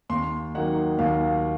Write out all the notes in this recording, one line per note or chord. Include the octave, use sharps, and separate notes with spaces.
D#2 C6
D#3 F#3 A#3 D#4 F#5
D#2 F5